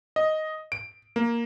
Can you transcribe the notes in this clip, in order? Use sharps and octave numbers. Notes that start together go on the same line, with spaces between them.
D#5
D7
A#3